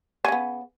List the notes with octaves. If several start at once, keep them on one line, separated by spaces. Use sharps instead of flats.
C#3 B3 C#4